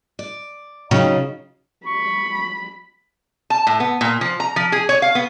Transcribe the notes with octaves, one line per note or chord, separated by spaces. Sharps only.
D5
C#3 F#3 D#4 F4
B5 C#6
A5
A2
B3
A#2
F3
A#5
F3
G#4
C#5
F5
B3